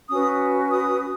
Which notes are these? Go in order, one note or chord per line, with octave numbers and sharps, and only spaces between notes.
C#4 F#4 B4 D#6
D#6